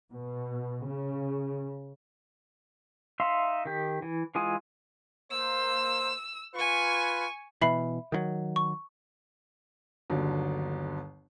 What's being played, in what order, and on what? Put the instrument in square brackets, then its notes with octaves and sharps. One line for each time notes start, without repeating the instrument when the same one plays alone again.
[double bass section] B2
C#3
[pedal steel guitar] D#4 E5 F5 C6
D#3 G4
E3
E3 G#3 F4 G#5 D#6
[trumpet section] A#3 C5 [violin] E6
[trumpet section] F4 B4 [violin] G#5 C#6
[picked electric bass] B2 E3 [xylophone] E5 B5 C7
[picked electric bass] D#3 E3 F#3
[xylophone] C#6
[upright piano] G1 D#2 D3 F#3